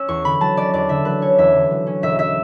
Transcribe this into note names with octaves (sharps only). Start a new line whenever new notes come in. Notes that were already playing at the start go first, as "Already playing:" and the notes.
Already playing: C#4 E6
E2 C#6
D3 B5
F#3 A5
C#4 D5
E2 D5
D3 E5
F#3 B4
C#4 C#5
E2 E5
D3
F#3
C#4
E1 E5
E5